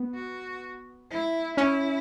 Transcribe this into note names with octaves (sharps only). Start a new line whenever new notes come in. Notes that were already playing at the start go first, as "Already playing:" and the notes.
Already playing: B3
F#4
E4
C#4 E4